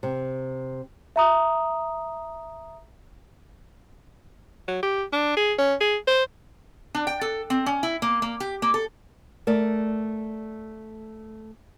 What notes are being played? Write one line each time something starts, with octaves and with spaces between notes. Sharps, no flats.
C3
E5 A#5 D#6
F#3
G4
D4
G#4
C#4
G#4
C5
D4
G5
A4
C4
C#4
E4
A#3
A#3
G4
A#3
A4
A3 A#4 D5